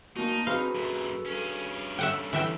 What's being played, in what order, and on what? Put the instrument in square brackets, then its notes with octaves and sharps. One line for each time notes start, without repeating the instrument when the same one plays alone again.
[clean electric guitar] A#3 F#4 [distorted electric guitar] D#4 [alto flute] A5
[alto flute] C4 [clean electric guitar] F#4 G#4 B4 [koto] F5
[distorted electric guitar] F#2 A#2 [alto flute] A4
[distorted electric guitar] G2 C#4
[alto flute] A4 [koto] E5 F#5 G5
[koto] E3 E5 G5